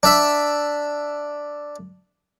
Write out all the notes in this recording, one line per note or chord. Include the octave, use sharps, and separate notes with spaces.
D4 E5